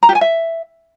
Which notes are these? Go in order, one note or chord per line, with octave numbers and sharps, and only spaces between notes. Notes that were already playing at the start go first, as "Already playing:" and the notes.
A#5
G4
G#5
E5